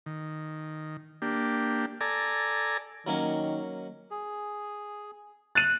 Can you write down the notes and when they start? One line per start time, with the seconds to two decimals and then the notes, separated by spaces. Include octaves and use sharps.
0.06 D#3
1.22 A#3 D4 G4
2.01 A4 D5 G#5 A#5
3.07 D#3 F#3 A#3 C#4
4.11 G#4
5.55 F#6 A6 D#7